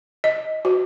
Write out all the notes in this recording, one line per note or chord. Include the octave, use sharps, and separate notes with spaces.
D#5
F#4